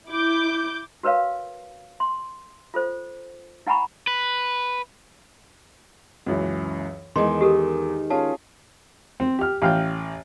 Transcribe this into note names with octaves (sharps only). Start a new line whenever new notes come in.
E4 D6 G6
F#4 A#4 B4 C#5 F5
C6
F4 A4 C5
E4 F#5 G#5 A#5 B5 C#6
B4
C#2 F#2 E3
E2 D#3 G#3 C6
G4 A4 A#4
C#4 F4 G#4 A5
C4
G4 F6
A1 F5 G5